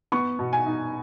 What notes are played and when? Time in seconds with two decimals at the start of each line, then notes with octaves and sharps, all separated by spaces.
0.12 B3 C#6
0.39 B2
0.53 G#5
0.66 D#4